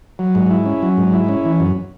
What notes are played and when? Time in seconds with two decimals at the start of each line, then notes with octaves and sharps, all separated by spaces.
0.19 F#3
0.35 G#2
0.50 E4
0.66 C#4
0.82 F#3
0.97 G#2
1.14 E4
1.29 C#4
1.45 E3
1.60 F#2